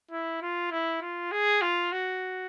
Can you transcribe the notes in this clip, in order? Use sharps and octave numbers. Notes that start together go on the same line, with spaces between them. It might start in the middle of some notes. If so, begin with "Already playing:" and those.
E4
F4
E4
F4
G#4
F4
F#4